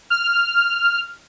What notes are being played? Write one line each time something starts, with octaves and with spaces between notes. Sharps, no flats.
F6